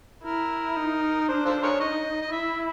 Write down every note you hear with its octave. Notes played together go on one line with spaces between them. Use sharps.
E4 A#4
D#4
D4 C5
F4 A4 C5
G#4 A#4 C#5
D#4 D#5
D#5
E4 E5